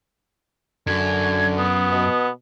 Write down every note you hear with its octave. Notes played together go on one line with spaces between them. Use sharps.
F#2 D3 G#6
B3 D#6
B2